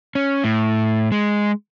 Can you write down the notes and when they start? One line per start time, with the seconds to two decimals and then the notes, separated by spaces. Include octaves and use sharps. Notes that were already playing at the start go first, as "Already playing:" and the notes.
0.15 C#4
0.44 A2
1.12 G#3